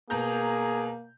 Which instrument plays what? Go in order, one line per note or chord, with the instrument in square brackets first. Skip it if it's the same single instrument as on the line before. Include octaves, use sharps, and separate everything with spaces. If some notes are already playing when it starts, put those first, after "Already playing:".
[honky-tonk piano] B2 A#5 G6 [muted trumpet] A#3 [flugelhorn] G#4